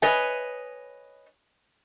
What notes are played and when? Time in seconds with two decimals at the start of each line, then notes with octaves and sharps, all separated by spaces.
0.02 B4 C#5 D#5 G#5